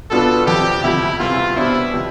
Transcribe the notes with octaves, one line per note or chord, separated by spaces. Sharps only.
B2 B3 D4 F4 A4 B4
F2 C3 F3 G4
D2 C3 F3 E4
E2 C3 E3 G3 F4
B2 B3 D4 E4 G4 C5
C3 F3 C4